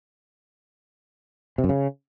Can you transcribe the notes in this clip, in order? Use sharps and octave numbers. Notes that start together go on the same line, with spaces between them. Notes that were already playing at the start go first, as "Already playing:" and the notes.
C3
F#2
C#3